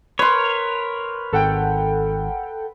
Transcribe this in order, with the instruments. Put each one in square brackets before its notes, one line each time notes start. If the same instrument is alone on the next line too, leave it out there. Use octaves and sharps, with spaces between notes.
[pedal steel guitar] A#4 C#5 [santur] B4 C6
[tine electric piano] G#1 [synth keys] A4 F#5 G5